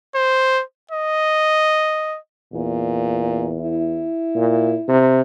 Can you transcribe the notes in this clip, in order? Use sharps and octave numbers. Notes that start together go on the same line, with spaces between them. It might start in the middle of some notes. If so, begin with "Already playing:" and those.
C5
D#5
E2 A#2
E4
A#2
C3